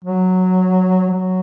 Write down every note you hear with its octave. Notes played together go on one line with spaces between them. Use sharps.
F#3
F#3